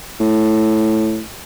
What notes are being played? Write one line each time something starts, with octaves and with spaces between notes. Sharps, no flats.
A2